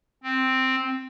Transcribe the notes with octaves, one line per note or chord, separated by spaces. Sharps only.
C4